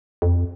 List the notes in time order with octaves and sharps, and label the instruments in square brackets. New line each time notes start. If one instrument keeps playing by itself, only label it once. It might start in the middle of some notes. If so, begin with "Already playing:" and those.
[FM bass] F2